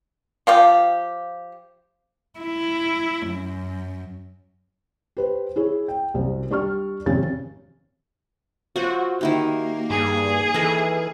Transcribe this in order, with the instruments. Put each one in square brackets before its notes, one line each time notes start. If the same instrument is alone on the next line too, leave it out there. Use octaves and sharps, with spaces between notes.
[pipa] F3 F4 G4
[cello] E4
F#2
[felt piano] G4 B4 C5
E4 G#4 C#5
G5
C2 F#2 C5
G3 D4 G4 C#6 F6
G#1 F2 C3 C#4 A6
[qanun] F#3 F4 C5 [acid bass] F#4
[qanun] D#3 E4 G4 [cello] A#3
[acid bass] G2 [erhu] G#4
[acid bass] E3 [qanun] A4 A#4 D#5